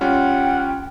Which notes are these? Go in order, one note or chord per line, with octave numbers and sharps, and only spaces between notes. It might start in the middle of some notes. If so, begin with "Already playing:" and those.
G3 C#4 F4 F#5 G5